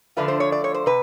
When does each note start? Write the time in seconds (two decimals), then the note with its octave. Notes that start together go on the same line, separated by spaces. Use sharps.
0.17 D3 F3 A3 D4 F4 B4
0.28 C5
0.40 C#5
0.52 D5
0.64 C#5
0.74 C5
0.86 C3 B4